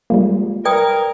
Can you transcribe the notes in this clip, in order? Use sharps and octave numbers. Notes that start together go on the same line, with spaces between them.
G3 G#3 A#3 F4
A#4 B4 D5 G5 D#6